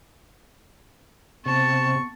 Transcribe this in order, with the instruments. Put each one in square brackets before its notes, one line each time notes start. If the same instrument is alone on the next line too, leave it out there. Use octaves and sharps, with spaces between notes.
[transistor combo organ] C3 [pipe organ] B3 [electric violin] A5 [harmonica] C#6